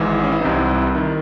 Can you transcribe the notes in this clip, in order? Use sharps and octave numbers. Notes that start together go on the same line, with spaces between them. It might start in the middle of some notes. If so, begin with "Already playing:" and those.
Already playing: G#1 G#2 E3
C#4
E4
C2 C3 E3 D#4
E4
D#3 E4